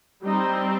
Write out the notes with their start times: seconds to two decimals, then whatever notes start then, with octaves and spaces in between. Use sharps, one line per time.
0.25 G3 C4 D#4